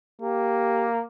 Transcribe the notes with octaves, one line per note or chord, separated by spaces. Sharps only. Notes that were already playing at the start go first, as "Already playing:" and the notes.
A#3 G4